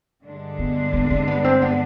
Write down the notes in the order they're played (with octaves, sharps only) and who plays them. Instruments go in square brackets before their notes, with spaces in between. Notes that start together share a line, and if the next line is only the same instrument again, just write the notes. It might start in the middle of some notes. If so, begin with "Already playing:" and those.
[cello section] G2 D3 G#3 D4
[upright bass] B3
B3
C4
B3
C4
B3